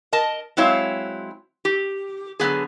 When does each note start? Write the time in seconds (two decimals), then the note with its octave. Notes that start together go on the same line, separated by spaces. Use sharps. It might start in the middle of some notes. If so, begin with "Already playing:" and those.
0.13 A#4 D#5 A5
0.57 F#3 G#3 C4 E4 C#5 F5
1.65 G4
2.40 D3 F#3 B3 G#4